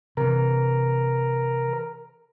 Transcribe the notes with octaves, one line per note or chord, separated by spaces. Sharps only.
C3 E3 A#4